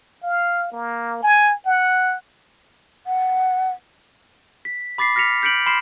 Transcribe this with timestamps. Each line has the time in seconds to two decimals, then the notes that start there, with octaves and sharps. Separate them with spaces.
0.23 F5
0.72 A#3
1.23 G#5
1.66 F#5
3.07 F#5
4.65 B6
4.98 B5 D6 A6 B6 C7
5.16 F6 A#6 B6 C#7 F7
5.42 F6 G6 B6 C#7 D7 F#7
5.66 B5 C6 F6 C7 E7